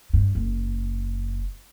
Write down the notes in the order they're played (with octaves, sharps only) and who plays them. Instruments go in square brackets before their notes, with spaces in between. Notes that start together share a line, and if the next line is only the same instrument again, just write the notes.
[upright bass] G2
F#1